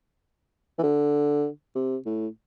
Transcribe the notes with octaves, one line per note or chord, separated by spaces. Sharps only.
E3
D3
C3
A2